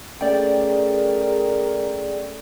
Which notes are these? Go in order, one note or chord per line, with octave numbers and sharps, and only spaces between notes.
A3 C#4 G#4 A#4 D5 G5